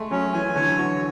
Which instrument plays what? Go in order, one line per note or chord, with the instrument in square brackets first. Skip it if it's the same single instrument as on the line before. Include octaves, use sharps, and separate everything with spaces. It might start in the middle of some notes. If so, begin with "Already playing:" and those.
Already playing: [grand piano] G#3 A3
[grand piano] F#3 [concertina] C#4
[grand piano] E3 [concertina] G#5
[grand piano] E3
[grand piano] D3 [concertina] C#5
[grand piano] F#3
[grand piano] E3 [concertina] F#4